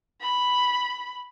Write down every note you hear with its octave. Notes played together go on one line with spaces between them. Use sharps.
B5